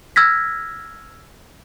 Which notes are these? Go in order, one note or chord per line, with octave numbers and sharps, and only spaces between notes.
E6 F6 G#6 A#6 B6